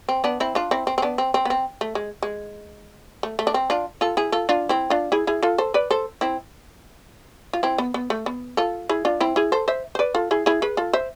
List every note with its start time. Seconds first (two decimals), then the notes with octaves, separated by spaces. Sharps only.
0.09 C4
0.24 B3 D4
0.40 C4 E4
0.55 D4 F4
0.71 C4 E4
0.87 C4
0.98 C4
1.02 B3 D4
1.18 C4
1.34 C4
1.45 B3
1.50 C4
1.81 A3
1.95 G#3
2.23 G#3
3.23 A3
3.39 A3
3.47 D4
3.54 C4
3.70 D4 F4
4.01 F4 A4
4.17 E4 G#4
4.32 F4 A4
4.49 D4 F4
4.69 C4 E4
4.90 D4 F4
5.12 E4 G#4
5.27 E4 G#4
5.43 F4 A4
5.58 A4 C5
5.74 B4 D5
5.91 A4 C5
6.21 C4 E4
7.53 F4
7.63 C4 E4
7.78 B3
7.94 B3
8.10 A3
8.26 B3
8.57 F4 A4
8.89 E4 G#4
9.05 D4 F4
9.20 C4 E4
9.36 E4 G#4
9.52 A4 C5
9.68 C5 E5
9.95 C5
9.99 B4 D5
10.15 F4 A4
10.31 E4 G#4
10.46 E4 G#4
10.62 G#4 B4
10.77 F4 A4
10.93 C5 E5